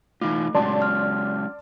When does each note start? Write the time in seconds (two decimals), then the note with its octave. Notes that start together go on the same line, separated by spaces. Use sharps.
0.21 E3 A3 D#4 F4
0.55 F#3 G#3 C#4 D5 A5 C6
0.82 F6